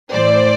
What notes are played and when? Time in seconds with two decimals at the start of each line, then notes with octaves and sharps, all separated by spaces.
0.12 A2 E3 C5 D5